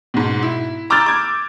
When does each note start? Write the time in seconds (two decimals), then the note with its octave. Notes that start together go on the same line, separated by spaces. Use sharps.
0.14 G#2 B2
0.43 E4
0.90 A#5 D6 E6 F6 G6 A6
1.06 D6 G#6